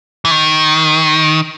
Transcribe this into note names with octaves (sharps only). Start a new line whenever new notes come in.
E3
D#3